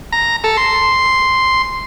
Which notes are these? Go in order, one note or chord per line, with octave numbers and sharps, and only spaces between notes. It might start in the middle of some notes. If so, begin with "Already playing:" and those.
A#5
A4
C6